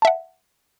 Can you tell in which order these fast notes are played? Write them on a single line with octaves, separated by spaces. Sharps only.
A5 E5 F#5